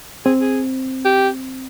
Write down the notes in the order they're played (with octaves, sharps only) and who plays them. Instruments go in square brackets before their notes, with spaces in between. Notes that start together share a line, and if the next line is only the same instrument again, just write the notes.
[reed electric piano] C4 [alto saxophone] G#4
[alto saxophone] G#4
G4